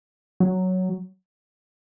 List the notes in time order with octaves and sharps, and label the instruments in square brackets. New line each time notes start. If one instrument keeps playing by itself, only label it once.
[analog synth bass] F#3